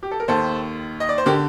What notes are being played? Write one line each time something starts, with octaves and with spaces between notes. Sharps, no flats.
G4
A4
A#4
D#2 D#3 A4 C5
D#5
D5
C5
D3 G4 A#4